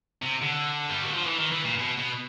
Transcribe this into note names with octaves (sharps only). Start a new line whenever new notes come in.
C3
D3
G3
F#3
F3
E3
D#3
E3
A#2
B2
B2